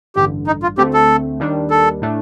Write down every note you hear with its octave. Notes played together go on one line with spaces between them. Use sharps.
A1 G2 D3 G4
D#4
F4
D2 D3 A3 C4 G4
A4
D#2 D#3 G3 D4
A4
A2 A3 D4